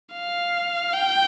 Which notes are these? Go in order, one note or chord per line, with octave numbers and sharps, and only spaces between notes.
F5
G5